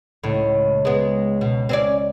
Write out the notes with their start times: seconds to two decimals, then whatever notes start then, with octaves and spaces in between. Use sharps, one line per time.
0.24 C#2 A2
0.85 G#3 B3
1.41 B2
1.69 C4 C#4 D5